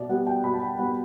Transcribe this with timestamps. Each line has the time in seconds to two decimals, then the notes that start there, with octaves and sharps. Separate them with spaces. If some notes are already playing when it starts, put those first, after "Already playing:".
Already playing: B2 D5 E5
0.09 G3 B3 F#5
0.27 G5
0.44 B2 B5
0.54 A5
0.61 G5
0.79 G3 B3 F#5